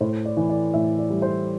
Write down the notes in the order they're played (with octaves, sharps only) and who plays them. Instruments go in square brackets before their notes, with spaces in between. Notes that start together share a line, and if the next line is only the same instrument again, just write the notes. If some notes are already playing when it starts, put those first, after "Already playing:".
[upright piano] A2 C5
D5
E3
D5
A2 E5
D5
G3
C5